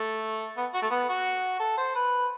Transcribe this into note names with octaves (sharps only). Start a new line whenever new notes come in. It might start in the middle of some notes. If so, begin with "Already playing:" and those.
Already playing: A3
B3
F#4
A3
B3
F#4
A4
C5
B4